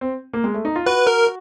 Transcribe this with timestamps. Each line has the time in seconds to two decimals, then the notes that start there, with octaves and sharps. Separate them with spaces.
0.01 C4
0.33 A#3
0.44 G#3
0.54 A3
0.65 D#4
0.76 F4
0.86 F#4 B4
1.07 A#4